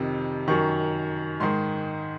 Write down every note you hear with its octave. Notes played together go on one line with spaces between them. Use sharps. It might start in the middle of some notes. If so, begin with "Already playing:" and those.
Already playing: F2 C3 D#3
F#2 D#3 C#6
G#2 D#3 C6